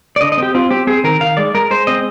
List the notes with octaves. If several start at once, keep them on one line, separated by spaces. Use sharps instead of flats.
D5
D3 D#5
D#5
C4 G4
C4 F4
C4 G4
C4 G#4
D#3 A#4
D#3 F5
G#3 D5
G#3 A#4
G#3 C5
C4 D#5